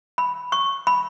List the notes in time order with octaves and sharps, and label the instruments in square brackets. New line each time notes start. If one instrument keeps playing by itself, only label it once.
[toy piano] B5
C#6
B5